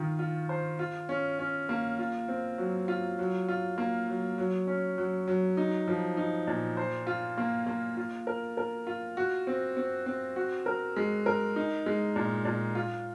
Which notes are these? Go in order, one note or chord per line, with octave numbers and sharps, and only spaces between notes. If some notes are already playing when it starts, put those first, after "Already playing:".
Already playing: D#3 F4
F4
C5
F4
C#4
C#4
A#3
F4
C4
F#3
F4
F#3
F4
A#3
F#3
F#3
C#4
F#3
F#3
D#4
F3
D#4
A#2
C5
F4
A#3
A#3
F4
A#4
A#4
F4
F#4
C4
C4
C4
F#4
A#4
G#3
A#4
D#4
G#3
A#2
A#2
F4